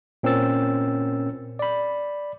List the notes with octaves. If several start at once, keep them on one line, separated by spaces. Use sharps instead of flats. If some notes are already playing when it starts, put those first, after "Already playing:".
A#2 C4 C#4 A#4 E6 A6
D5 B5